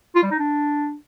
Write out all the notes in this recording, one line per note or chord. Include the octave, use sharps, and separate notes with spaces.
F4
G3
D#4
D4